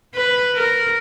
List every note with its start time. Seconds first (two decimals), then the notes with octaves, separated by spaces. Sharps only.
0.15 B4
0.55 A#4